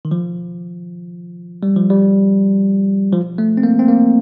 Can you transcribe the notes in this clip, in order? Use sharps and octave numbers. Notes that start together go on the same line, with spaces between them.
D#3
F3
G3
F3
G3
F3
A3
C4
A#3
C4
A#3